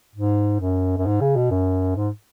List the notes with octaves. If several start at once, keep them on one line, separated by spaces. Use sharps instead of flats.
G#2
F#2
F#2
G#2
C#3
B2
F#2
G#2